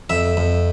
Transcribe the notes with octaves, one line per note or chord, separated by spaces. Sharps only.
F2 E5
F2